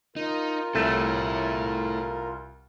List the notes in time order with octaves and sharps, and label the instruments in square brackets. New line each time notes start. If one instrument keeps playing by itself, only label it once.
[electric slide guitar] D#4 [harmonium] F4 A#4
[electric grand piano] C2 D#7 [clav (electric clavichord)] A3 [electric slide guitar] E4 A4